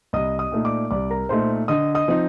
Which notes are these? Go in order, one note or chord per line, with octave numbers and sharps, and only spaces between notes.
C2 D#5 D#6
D#5 D#6
A#2 A3 D#4
D5 D6
C2 D5 D6
A#4 A#5
A#2 A3 D#4 C5 C6
D3 D#5 D#6
D#5 D#6
F3 C4 D#4